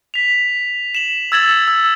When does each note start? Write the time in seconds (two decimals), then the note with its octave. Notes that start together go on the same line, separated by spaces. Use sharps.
0.14 B6 F7
0.95 E7 F#7
1.32 E6 G#6 A6 E7 F#7
1.68 E6